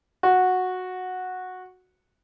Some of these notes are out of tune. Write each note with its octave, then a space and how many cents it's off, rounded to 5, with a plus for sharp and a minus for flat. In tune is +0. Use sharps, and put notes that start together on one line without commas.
F#4 -10